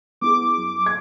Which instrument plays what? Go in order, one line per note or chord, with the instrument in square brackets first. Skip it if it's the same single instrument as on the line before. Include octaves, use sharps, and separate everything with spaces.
[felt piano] B3 E4 G#4 [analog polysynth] D6
[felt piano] F#2
G#6